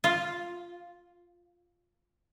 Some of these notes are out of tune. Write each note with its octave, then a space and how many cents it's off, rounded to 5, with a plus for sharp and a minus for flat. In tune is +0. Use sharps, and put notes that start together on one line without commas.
F4 +0